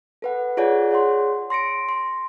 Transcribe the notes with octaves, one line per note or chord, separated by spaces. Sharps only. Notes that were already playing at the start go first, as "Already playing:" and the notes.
A4 B4 F#5
F4 G#4 C#5 D5 F#5 G#5
G#4 C#5 F#5 C6
C6 A#6 C#7 D7
C6